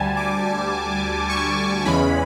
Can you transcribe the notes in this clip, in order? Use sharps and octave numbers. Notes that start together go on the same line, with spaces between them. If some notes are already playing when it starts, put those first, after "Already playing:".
Already playing: D2 D3 G3 G#5 A5
D6
C#6
E2 C#3 E3 G#3 C#4 B5